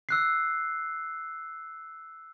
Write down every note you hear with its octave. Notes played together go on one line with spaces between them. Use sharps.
E6 F#6 C7